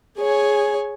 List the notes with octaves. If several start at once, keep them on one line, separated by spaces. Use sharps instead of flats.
G#4 C#5 G#5